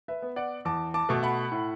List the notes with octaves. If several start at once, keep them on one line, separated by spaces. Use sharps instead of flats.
B4 E5
B3
D5 F#5
E2 A5 D6
A5 D6
B2 A3
F#5 B5
A2